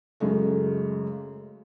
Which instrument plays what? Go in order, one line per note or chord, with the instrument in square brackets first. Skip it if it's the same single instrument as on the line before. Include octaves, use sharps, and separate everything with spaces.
[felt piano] F#2 C#3 G#3 A3